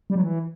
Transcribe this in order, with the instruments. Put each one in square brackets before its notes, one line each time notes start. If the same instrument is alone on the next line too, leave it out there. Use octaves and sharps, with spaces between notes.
[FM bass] G3
F#3
E3